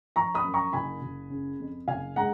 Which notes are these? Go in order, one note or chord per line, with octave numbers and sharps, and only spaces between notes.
F3 A#5 C#6
B5 D#6
F#2
A#5 C#6
F#1 G#5 B5
F#1
C#3
F2
F#1 F5 G#5
G#3 F#5 A#5